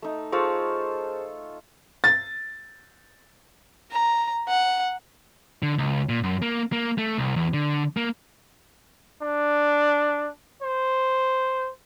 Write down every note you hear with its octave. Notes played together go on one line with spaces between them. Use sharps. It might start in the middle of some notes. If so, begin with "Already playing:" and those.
A3 D#4
F4 G#4 A4 C5 C#5 A5
A6
A#5
F#5
D3
C#2
A#2
F#2
A#3
A#3
A3
C2
E2
D3
A#3
D4
C5